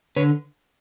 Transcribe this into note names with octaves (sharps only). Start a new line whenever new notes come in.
D3 B4 C#5